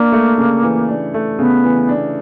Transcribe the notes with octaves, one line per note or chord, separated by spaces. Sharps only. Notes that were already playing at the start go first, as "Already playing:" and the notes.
Already playing: A#3 D4
A3
C#3
E3
D4
A3
C#3 B3
E3
D4